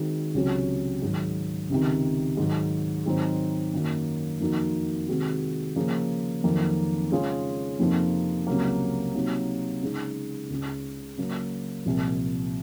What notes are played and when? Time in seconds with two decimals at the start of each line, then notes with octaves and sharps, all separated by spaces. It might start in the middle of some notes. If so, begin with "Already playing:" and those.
Already playing: D#3 G#3 C4 F#4
0.34 C#2 C3 F#3 C#4 F#4
1.02 G#2 D#3 F#3
1.70 C#2 C3 D#3
2.37 G#2 D#3 F#3
3.06 G#2 D#3 F#3 C4 D#4
3.73 F#2 D#3 F#3 A#3
4.40 F2 D#3 A#3 D#4 F#4
5.08 C3 D#3 G#3 C4 F#4
5.76 C#3 F3 A#3 C#4 G#4
6.44 F2 D#3 F#3 A#3 D#4
7.11 C#3 G#3 C#4 F4 G#4
7.79 F2 C3 F3 A#3 D#4
8.47 C#2 C3 F#3 A#3
9.15 C3 F#3 A#3 D#4
9.82 C#3 G#3 D#4
10.50 C#2 C#3 G#3
11.18 C#3 F#3 A#3
11.85 C2 A#2 F3